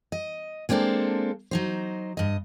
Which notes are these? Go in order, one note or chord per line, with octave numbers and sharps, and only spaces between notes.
D#5
G#3 A#3 C4 D4 A4
F#3 D#4 C5
G2 D#5